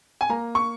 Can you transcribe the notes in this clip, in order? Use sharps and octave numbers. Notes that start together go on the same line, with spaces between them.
G#5
A#3 A#5
C#6